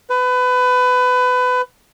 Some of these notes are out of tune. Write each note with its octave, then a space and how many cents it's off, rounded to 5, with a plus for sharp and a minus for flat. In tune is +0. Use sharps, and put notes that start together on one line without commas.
B4 +25